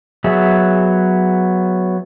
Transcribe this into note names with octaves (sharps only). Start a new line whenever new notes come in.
F#3 B3 G#4 E5